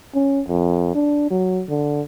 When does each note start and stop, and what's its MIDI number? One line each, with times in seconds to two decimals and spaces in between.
0.14 0.41 61
0.48 0.90 41
0.95 1.28 62
1.31 1.63 54
1.69 2.02 50